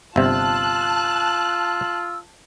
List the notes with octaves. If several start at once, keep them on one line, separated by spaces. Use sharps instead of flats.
G1 C3 F4 A5 E6 F#6